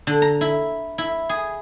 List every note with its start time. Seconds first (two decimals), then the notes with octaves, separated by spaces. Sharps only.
0.07 D3
0.22 A#5
0.41 E4
0.98 E4
1.29 G#4